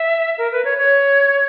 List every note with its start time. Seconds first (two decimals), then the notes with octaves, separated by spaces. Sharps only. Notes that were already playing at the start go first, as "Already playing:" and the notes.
Already playing: E5
0.38 A#4
0.52 B4
0.64 C#5
0.78 C#5